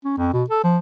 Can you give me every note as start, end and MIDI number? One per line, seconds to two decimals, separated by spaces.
0.04 0.15 61
0.17 0.29 41
0.33 0.43 47
0.50 0.61 69
0.64 0.78 53